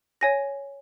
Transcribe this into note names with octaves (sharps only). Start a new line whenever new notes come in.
C#5 G#5 A#6